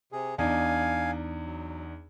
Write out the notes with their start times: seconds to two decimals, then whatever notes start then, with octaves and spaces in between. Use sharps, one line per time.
0.12 C3 G#4
0.38 E2 D4 D#4 F5 G#5
1.46 F#3